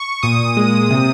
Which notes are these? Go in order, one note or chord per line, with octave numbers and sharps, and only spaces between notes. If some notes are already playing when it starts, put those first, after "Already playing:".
Already playing: C#6
A#2 D#6
G#3
C3